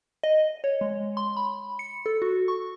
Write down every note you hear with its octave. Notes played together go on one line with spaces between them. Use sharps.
D#5
C#5
G#3
C6
B5
C#7
A4
F#4
C#6